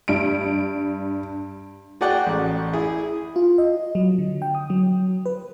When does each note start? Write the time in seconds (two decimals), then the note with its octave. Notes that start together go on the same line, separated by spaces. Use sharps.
0.08 G2 D7
2.01 F#4 G#4 D5 F#5 G5
2.27 A1
2.73 E4 G#4
3.36 F4
3.58 D#5
3.95 F#3
4.19 D3
4.42 G5
4.55 D#6
4.70 F#3
5.26 B4